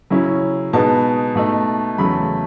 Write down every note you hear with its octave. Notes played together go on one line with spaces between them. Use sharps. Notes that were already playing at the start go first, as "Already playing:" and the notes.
C#3 F#3 C#4 E4
B2 G#3 B3 D#4 A5
B2 A3 D#4
E2 C#3 F#3 A3 B5